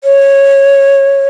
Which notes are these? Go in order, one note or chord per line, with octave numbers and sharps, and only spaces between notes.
C#5